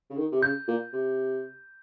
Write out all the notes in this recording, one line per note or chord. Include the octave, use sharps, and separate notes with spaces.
C#3
D#3
C3
C#3 G6
A#2
C3